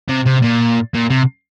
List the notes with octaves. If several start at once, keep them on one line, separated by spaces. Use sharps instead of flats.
C3
C3
A#2
A#2
C3